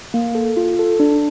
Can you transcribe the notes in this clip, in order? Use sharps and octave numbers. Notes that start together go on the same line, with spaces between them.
A#3
A4
F4
A4
D4